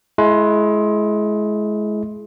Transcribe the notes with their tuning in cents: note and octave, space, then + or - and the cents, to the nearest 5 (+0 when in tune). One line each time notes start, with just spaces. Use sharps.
G#3 +30 E4 +10